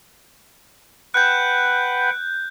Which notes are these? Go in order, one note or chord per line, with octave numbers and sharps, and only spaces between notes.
B4 F#5 G5 F#6 G6